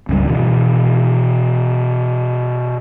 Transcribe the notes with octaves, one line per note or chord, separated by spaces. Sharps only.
C#2 G2 F3 G3
B2 D#3 E3